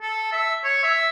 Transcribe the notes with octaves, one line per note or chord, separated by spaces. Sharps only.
A4
E5
C#5
E5